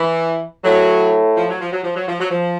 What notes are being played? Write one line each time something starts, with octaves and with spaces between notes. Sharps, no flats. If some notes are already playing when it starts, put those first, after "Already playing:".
Already playing: E3
A2 F#3
F3
F#3
F3
F#3
F3
F#3
F3
F#3
F3